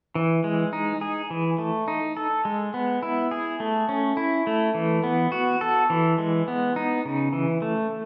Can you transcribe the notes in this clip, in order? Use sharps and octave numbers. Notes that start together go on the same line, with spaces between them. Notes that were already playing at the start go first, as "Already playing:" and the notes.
E3
G#3
D#4
G#4
E3
A3
D#4
A4
G#3
B3
E4
G#4
A3
C#4
E4
A3
E3
B3
F#4
A4
E3
G#3
B3
D#4
C#3
E3
A3